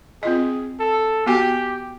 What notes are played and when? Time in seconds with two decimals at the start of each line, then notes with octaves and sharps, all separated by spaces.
0.23 C4 F4 G#4 D#5
0.80 A4
1.26 B3 F#4 G4 G#5